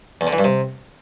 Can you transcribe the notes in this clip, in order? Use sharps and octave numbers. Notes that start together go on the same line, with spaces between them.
E2
D3
E3
G2
C3